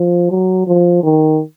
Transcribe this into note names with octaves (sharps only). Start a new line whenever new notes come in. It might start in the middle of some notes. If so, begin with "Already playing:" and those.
Already playing: F3
F#3
F3
D#3